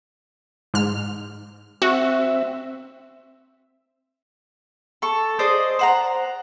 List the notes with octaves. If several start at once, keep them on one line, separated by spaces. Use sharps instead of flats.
G#2 F6
C4 F#4 E5
A4 C#6
G#4 C5 D5 D#5
C5 F#5 A#5